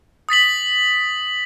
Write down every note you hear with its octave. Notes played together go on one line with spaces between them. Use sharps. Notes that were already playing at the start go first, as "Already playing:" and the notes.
D#6 A6 B6 F#7